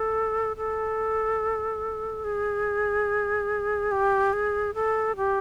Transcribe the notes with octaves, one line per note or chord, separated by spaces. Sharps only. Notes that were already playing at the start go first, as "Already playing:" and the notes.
Already playing: A4
A4
G#4
G4
G#4
A4
G4